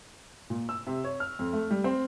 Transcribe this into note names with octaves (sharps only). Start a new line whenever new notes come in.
A#2
E6
C3
C#5
F6
F2
A3
G3
C4